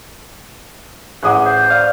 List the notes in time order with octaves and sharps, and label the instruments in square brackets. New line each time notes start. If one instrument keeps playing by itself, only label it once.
[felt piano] A1 G#4 D#6 [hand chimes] F#5 D6 F#6
[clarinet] C5
[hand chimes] D5 [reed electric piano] F5